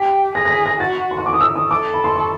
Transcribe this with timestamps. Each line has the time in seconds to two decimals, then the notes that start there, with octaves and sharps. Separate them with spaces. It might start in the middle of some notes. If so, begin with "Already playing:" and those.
Already playing: G4 B6
0.35 G#4 A#6
0.45 A#6
0.51 B6
0.66 A#6
0.80 F#4 A6
1.11 C6
1.18 C#6
1.26 D6
1.33 D#6
1.41 E6
1.56 D#6
1.71 A4 D6
1.94 B5
2.04 C6
2.16 C#6